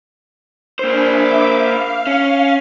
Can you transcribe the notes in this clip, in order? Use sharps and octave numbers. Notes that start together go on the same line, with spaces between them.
A#3 D4 C5 G#5
E5 D6
F5
C#4